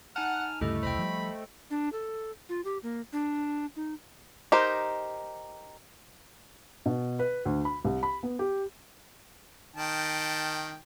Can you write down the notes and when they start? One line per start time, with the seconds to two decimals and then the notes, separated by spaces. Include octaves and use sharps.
0.16 D#4 F#5 G#5 A5 F6
0.61 D2 G2 C#3 A3 E4 G4 A4 D#5
0.83 E1 C2 C5 D#5 G5 B5
0.99 F3 G3
1.71 D4
1.93 A4
2.49 F4
2.65 G4
2.83 A#3
3.13 D4
3.76 D#4
4.52 D#4 G4 A#4 C5
6.86 B2
7.19 B4
7.45 D2
7.65 B5
7.85 C2
8.03 B5
8.23 B3
8.39 G4
9.76 D#3 G5 A5